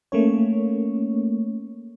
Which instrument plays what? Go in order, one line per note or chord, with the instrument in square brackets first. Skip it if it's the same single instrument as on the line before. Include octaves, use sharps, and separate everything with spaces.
[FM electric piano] A3 A#3 C#4 C#5